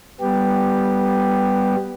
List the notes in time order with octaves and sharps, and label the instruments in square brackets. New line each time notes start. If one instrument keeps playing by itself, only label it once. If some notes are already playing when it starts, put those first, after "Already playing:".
[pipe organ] G3 B3 G4